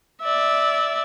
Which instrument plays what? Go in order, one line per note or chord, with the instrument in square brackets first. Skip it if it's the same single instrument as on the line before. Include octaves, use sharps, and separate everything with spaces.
[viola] D5 E5